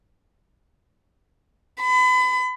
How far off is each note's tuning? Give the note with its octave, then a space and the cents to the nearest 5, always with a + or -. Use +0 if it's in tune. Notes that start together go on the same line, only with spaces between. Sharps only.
B5 +35